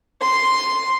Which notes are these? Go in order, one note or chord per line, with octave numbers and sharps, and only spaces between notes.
C6